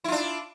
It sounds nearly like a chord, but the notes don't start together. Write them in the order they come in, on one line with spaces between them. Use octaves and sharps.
E4 F4 D4